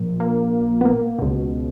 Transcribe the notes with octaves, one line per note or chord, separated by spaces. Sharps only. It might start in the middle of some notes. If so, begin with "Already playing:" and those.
Already playing: A#1 A#2
A#3
B3
A#3
C#2 B2